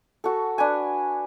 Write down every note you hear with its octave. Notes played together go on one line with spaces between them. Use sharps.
F#4 A4
D4 B4 G#5